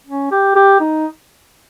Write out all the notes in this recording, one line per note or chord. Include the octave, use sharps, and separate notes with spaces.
C#4
G4
G4
D#4